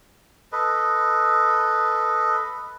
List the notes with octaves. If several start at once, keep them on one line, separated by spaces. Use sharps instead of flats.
A4 B4 D#5